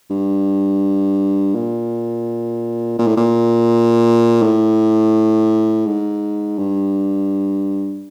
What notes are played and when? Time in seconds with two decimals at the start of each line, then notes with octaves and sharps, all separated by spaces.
0.10 G2
1.55 A#2
2.98 A#2
3.07 A2
3.17 A#2
4.42 A2
5.86 G#2
6.59 G2